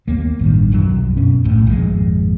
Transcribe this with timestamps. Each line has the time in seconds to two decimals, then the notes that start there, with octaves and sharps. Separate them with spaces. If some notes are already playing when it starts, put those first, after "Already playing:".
0.07 D#2 A#3 B3
0.39 A1 G2 D#3
0.71 D#1 B1 F#2 F#3
1.17 F#2 B2 C#4
1.44 B1 A2
1.67 G#1 F2 A#2 G#3